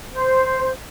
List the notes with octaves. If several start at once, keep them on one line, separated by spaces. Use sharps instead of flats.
C5